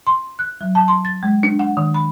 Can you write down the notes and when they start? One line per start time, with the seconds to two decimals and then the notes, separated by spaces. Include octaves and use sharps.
0.07 C6
0.39 F#6
0.61 F#3
0.75 A5
0.88 C6
1.05 A6
1.23 G#3
1.43 D4
1.59 F#5
1.77 D#3
1.94 B5